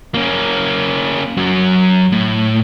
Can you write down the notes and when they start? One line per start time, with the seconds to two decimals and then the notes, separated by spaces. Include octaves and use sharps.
0.14 A#3 C#4
1.37 F#2 F#3
2.12 A2